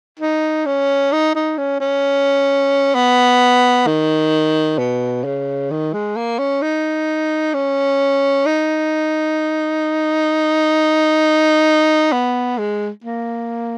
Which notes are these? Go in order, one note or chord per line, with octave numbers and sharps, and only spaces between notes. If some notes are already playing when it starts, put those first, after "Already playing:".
D#4
C#4
D#4
D#4
C#4
C#4
B3
D#3
B2
C#3
D#3
G#3
A#3
C#4
D#4
C#4
D#4
B3
G#3
A#3